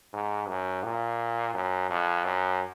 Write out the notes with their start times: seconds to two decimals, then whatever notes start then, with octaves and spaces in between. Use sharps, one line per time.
0.13 G#2
0.48 F#2
0.83 A#2
1.54 F#2
1.90 F2
2.25 F#2